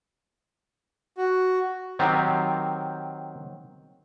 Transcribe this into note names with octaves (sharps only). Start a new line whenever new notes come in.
F#4
D#3 F#3 C4 G4